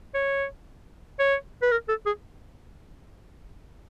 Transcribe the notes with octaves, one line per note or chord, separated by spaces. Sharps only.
C#5
C#5
B4
A#4
A4
G#4